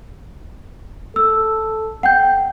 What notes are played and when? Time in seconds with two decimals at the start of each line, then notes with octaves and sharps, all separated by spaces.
1.16 A4 E6
2.03 F#5 G5 G6